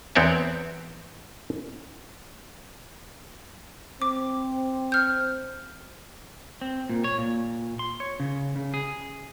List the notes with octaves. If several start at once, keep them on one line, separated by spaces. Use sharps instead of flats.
E2 B3 C4 C#5 D5 E5
C4 D6
F6 G6
C4
A#2
C#5
A#2
C6
C#5
C#3
C#3
G#4